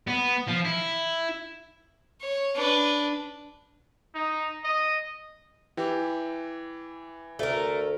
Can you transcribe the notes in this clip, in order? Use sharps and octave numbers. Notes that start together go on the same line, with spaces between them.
B3
F3
E4
C#5
D4 B4
D#4
D#5
E3 G4
D2 A3 A#4